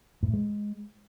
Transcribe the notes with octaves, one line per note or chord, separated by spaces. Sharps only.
G#2
A2
G#3